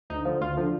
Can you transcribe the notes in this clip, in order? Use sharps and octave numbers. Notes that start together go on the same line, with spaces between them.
D2 D#4
D3 F3
D2 F4
D3 F3